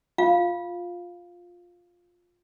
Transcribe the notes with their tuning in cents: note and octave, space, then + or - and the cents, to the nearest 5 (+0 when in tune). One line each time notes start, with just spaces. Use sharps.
F4 +10 F5 +0